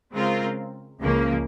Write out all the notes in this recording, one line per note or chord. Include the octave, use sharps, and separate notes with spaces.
C#3 G#3 C4 F4 A#4
C#2 C#3 F3 A#3